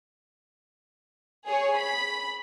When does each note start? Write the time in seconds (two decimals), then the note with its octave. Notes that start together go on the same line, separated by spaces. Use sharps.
1.47 G#4 C#5
1.76 B5